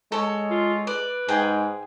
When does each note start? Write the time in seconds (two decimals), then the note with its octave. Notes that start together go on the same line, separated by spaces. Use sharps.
0.12 G#3 A4 C#5
0.50 F4
0.87 B4 D5
1.29 G#2 G#4 G5